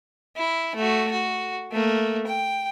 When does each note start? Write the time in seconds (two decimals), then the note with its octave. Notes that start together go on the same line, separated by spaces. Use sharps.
0.37 E4
0.75 A3 F#4
1.12 F#4
1.72 A3 A#3
2.27 G5